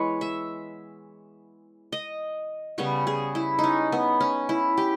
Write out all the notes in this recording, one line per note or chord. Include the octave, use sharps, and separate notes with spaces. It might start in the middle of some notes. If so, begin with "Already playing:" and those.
Already playing: E3 G#3 B3 B4 C#5
E5
D#5
C#3 G3 B3 C#5
G#4
E4
C#4 D#4
B3
C#4
E4
G4